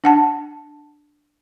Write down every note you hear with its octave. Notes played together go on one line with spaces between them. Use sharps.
D4 F#5 A5